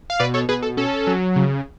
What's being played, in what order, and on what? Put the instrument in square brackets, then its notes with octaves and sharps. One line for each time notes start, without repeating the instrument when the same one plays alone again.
[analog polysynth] F5
B2 B4 D5
A4 C#5
B2 G#4 B4
A4
C#4 A4
F#3
C#3